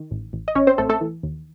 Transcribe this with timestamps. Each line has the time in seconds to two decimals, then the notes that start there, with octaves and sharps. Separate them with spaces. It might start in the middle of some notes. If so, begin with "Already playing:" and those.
Already playing: D#3
0.11 A1
0.33 A1
0.48 D#5
0.55 A1 C#4 C#5
0.67 C4 C5
0.78 A1 A3 A4
0.89 A3 A4
1.01 E3
1.23 D#2